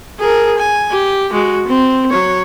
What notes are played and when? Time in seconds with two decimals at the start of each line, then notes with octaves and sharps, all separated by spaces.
0.20 G#4 A#4
0.58 G#5
0.92 G4
1.33 G#3 F#4
1.67 C4
2.11 F#3 C#5